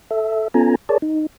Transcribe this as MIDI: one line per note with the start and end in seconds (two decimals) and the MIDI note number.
0.11 0.48 69
0.11 0.48 76
0.54 0.75 59
0.54 0.75 61
0.54 0.75 65
0.54 0.75 69
0.54 0.75 80
0.54 0.75 82
0.89 0.98 68
0.89 0.98 70
0.89 0.98 73
0.89 0.98 74
0.89 0.98 81
1.02 1.26 63